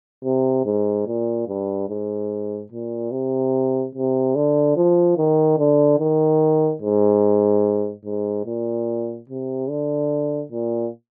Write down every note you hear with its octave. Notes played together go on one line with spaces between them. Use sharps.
C3
G#2
A#2
G2
G#2
A#2
C3
C3
D3
F3
D#3
D3
D#3
G#2
G#2
A#2
C3
D3
A#2